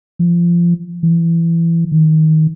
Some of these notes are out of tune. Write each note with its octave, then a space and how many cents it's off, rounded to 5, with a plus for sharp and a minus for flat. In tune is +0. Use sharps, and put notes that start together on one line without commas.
F3 -20
E3 +20
D#3 +15